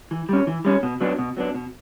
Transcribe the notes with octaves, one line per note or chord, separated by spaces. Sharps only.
E3
G3 C#4
E3
G3 C#4
B2
F#3 B3 D4
B2
F#3 B3 D4
B2